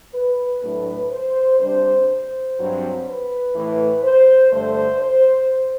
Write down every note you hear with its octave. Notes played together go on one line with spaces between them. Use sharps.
B4
A2 F#3 A3 D4 B4
C5
C3 G3 D4 C5
C5
G2 F#3 C4
B4
A2 E3 A3
C5
G2 D3 A3 C5
C5